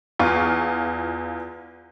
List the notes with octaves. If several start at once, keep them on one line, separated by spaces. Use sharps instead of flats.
E2 F4 C#6